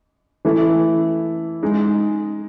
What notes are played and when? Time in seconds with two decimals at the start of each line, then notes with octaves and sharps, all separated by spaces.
0.45 E3 A3 E4 A4
1.63 G#3 D#4 G#4